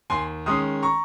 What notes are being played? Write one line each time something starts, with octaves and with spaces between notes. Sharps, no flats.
D#2 G#5 C6
D#3 G#3 C#4 C6 D#6
A#5 C#6